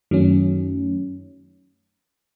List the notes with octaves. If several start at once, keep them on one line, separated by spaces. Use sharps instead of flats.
F#2 D#3 F#3 A3 C#4